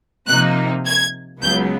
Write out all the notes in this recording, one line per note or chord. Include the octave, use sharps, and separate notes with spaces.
C3 F3 A#3 D#4 F#6
G#6
C#2 C#3 F#3 B3 G6